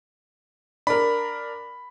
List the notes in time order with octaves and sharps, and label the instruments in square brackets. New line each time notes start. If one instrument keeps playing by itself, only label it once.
[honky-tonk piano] D4 A#4 [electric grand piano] B5